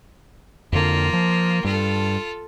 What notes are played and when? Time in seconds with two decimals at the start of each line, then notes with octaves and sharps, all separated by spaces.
0.72 F2 D3 A#3 F4
1.13 F3
1.64 G2 F4 A4